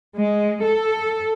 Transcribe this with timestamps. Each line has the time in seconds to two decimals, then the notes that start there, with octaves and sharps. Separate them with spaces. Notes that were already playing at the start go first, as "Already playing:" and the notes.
0.17 G#3
0.65 A4